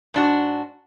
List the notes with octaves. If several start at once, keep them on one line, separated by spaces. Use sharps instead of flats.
G#2 D4 F#4